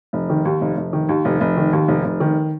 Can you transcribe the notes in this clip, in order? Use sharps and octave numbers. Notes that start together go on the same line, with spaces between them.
F1
D#3
D#2
F1
F1
D#3
D#2
F1
F1
D#3
D#2
F1
F1
D#3